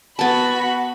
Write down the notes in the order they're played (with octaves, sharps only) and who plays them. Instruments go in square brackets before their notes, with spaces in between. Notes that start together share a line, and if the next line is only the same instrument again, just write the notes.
[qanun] B3 A5 [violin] F#4 B5